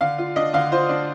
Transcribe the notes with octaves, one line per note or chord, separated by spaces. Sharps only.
D3 F5
F4
D4 D#5
D3 F5
F4 C5
D4